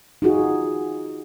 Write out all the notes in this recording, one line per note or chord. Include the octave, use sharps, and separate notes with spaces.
D#4 F4 F#4 G#4